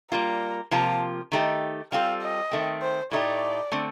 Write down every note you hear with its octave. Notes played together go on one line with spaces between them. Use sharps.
G3 A#3 F4 A#5
C3 F3 A#3 F4 A5
D#3 A3 D#4 G4
G3 C4 F4 A4 F5
D#5
D#3 A3 C4
C5
A2 A3 D#4 G4 D5
D3 A3 C4